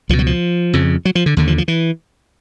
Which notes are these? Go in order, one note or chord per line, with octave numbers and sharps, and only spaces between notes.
C#2 B2 F3
F#3
F3
F2 C#3
F#3
F3
D3
D#2 D3
F3
F3
E3